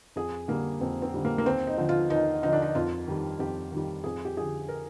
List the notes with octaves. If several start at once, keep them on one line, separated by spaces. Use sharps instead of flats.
F2 G#4
D3 G3 A#3
F2 C4
C4
D3 G3
A#3
A#3
D#2 C4
D#4
D3 F3
F4
D#2 D#4
D3 F3 D#4
D4
D#4
F2 F4
D#3 G3
F2 G4
D#3
G3
F2 G#4
G4
D3 F3 G#4
A#4